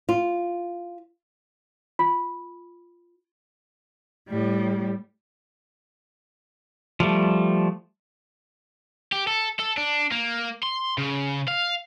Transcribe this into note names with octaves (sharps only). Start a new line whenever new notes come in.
F4
F4
A2 G3
F3 G3 A3
G4
A4
A4
D4
A#3
C6
C#3
F5